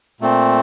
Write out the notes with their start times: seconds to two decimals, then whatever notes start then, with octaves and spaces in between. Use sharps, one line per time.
0.21 A#2 A3 C4